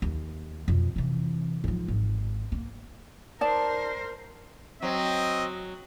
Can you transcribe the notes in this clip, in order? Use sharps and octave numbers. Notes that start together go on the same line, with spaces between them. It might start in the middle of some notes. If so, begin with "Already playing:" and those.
D#2
F2 B2
C3 E3
G#2 F3
G#1
A#3
D#4 A#4 C5 D5 A5
F#3 C4 D#5